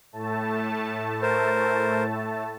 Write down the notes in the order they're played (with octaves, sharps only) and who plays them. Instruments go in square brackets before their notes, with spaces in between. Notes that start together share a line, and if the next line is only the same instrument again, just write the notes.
[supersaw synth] A2 A3 A5
[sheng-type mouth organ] A#4 C5